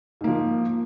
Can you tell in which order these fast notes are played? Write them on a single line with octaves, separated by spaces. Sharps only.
G#2 A#3 F3